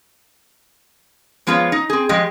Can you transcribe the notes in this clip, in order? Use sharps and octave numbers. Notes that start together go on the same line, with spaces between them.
F3 G#3 B3 F4 G#4 C#5
D#4
C4 G#4
F3 G#3 G4 D#5